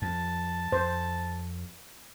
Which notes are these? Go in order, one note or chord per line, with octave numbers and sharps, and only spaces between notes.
F2 A5
F2 C5